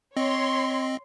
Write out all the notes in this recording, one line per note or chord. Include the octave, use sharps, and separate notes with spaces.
C4 C#5 D#5 C6